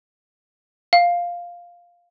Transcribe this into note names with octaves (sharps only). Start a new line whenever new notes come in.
F5